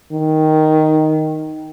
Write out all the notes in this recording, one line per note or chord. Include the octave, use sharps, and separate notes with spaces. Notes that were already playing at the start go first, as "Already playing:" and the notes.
D#3